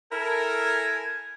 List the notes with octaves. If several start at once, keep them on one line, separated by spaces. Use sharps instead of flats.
E4 A4 A#4 G#5